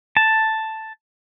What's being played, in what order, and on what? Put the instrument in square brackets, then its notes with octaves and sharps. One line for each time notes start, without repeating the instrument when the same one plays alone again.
[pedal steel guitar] A5